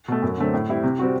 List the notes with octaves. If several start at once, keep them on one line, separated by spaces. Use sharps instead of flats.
B2 A3
F#2
D3 F#3 A3 C4
A2
G3 C4 E4
C3
G3 C4 F#4